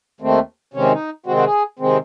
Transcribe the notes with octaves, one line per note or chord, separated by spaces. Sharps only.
D#2 D#3 A3 C4
C3 D#3 G#3 C4 C#4
D#4
C3 D#3 G#3 C4 F#4
F#4
G#4
C3 D#3 G#3 C4